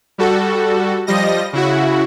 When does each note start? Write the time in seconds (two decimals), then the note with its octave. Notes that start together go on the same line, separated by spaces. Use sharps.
0.18 G3 F#4 A4
1.07 F3 G3 D#5 A#6
1.53 C#3 E4 F#4